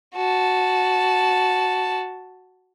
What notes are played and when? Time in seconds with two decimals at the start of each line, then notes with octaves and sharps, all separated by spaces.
0.15 F#4 A5